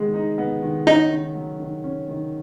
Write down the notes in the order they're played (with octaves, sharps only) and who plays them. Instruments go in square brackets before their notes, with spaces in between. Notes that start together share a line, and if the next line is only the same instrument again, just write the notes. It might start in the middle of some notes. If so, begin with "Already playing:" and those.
Already playing: [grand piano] D#3 G#3 B3
D#4
B3
D#3
[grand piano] C#4 [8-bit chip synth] D#4
[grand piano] D#3
F#3
D#3
C#4
D#3